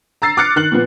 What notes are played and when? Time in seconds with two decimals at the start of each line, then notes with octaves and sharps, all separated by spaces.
0.22 A#5 E6 A6 C7
0.37 D6 F6 F#6 A6 C#7
0.56 D#3 F#6 F#7
0.72 A#2 F3 B3